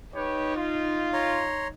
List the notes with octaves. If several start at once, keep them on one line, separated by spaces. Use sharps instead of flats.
D#4 G4 B4 C#5
F4
C#5 A#5 C6